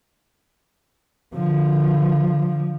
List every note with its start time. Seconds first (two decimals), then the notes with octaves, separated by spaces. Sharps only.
1.34 D3 F3